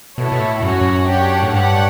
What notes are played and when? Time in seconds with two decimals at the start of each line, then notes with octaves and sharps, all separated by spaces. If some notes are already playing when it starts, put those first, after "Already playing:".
0.17 B2 E4 A4 C#5
0.32 B2
0.40 A2
0.62 F#2 C#4 F#4 C#5
0.81 F#2
1.08 D4 G4 C#5 F#5
1.42 A2
1.53 G2 D4 G4 C#5 F#5